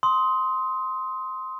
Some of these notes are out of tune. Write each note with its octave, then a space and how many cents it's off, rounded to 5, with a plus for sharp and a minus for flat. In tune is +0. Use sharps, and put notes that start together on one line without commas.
C6 +0 D#6 +25